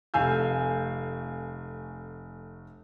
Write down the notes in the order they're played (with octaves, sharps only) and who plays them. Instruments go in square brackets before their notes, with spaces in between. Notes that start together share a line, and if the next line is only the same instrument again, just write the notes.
[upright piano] F1 A3 F5 G#5 E6 G6